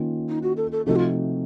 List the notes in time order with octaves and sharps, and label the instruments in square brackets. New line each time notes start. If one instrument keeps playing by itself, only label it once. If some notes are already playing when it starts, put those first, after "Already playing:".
Already playing: [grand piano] D#3 A#3 C#4 F4
[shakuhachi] D#4
F#4
A4
A4
[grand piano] C3 F3 A3 D#4 F#4 [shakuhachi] A4
[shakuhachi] F4